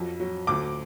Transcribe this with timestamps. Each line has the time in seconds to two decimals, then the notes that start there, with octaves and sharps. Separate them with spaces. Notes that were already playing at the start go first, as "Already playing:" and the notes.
Already playing: F2 F#3
0.20 F#3
0.47 D2 D6